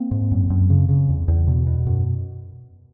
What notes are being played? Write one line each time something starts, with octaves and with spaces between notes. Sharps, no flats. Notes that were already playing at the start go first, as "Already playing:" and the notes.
Already playing: A#3 C4
G#2
F#2
F#2
C#3
C#3
E2
E2
B2
B2
F#2